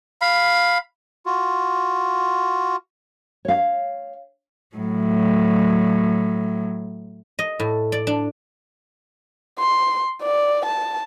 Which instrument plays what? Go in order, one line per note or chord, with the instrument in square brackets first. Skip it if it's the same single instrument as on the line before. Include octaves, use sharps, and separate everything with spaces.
[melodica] F5 B5
[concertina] F4 F#4
[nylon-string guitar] C#5 F5
[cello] A2 F#3
[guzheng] D#5
A2
D5
D4
[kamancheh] C6
D5
A5